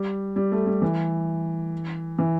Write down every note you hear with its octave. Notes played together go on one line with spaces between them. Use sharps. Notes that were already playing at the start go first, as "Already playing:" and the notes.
Already playing: G3
G3
A3
G3
E3
E3